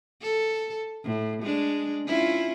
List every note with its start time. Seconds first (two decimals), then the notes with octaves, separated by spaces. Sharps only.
0.22 A4
1.04 A2
1.43 G#3 D4
2.06 C#4 E4 F4